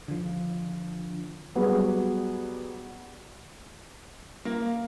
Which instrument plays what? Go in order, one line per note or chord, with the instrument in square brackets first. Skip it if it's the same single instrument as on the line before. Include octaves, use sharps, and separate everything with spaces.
[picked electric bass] D3 F3
[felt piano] F#3 G3 B3 G#4 B4
[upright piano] A#3